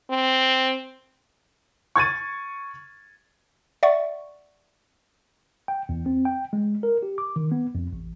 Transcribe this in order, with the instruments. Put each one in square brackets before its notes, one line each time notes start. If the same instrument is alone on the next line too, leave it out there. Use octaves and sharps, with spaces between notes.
[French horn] C4
[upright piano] C#6 G#6 A6 D#7
[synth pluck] D5 E5 F#5 C#6
[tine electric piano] G5
E2
C4
G5
G#3
A#4
G4
D6
D#3
B3
F2
A1